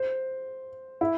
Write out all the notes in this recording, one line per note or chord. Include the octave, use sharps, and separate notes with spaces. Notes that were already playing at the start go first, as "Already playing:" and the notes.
Already playing: C5
E4